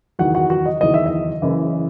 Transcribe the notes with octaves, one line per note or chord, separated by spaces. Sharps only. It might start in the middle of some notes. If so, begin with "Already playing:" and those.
F#1 E2 D#3 F#4 F#5
F#4 F#5
F#4 F#5
D#5
F#1 E2 D#3 D#5
E5
D#5
F#1 F#2 C#3 E3